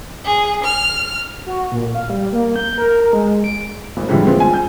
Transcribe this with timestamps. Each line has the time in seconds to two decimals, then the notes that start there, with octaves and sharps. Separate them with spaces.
0.24 G#4
0.64 F6
1.46 F#4
1.72 A#2
1.95 F5
2.10 G3
2.33 A#3
2.56 G6
2.78 A#4
3.02 A#4
3.13 G#3
3.44 D7
3.97 G#1
4.08 A2 D3 E3 F3 G3 G#3
4.27 G#3 B3 C4 F4
4.40 G#5
4.54 G6